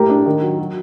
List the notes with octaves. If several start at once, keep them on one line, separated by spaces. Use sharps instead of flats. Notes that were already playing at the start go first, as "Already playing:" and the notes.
Already playing: A2 A3 G4 A#4
D4
D#3
F#3
F#3